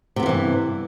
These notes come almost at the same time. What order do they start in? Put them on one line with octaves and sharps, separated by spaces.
C3 B3 F3 E3 G2